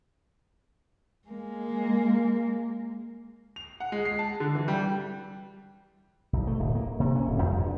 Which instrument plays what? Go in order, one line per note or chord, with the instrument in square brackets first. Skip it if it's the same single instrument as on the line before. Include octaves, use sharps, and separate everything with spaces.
[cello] G#3 A#3
[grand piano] F7
F#5
G#3
C7
A5
D3
E3
G3
[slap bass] B1
A3
D1
A#3
C3
C#4
D1
F2
G2